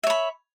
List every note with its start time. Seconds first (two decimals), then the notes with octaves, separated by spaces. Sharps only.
0.03 E5
0.07 C#5
0.10 B5